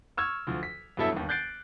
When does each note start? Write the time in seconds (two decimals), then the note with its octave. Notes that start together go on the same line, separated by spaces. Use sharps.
0.17 C#6 E6 F6 G#6
0.47 D2 F3
0.63 B6
0.97 E2 G2 F#3 E4 A4 E5
1.12 G1 D#2
1.29 F#6 G6 A6 C7 D7